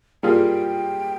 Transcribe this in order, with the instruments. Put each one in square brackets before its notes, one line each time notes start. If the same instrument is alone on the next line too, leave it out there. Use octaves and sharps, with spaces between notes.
[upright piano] G3 A#3 F4 G#4 [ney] G5